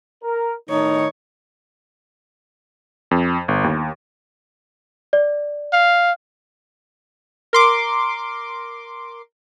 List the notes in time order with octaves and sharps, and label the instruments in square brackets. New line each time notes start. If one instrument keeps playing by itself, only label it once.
[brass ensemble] A#4
[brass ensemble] A2 D#3 [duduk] D#4 [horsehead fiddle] C#5
[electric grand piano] F2
G1
D#2
[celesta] D5
[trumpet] F5
[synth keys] A#4 C6 D6